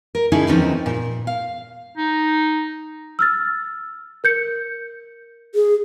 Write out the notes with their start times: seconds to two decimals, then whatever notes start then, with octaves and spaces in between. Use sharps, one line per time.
0.15 A#4
0.32 D3 C#4 D#4 E4 G#4
0.47 E2 D#3 F3 C4 C#4 D#4
0.86 A#2
1.27 F5
1.97 D#4
3.19 E6 F6 A6
4.24 A#4 G6 C#7
5.55 G#4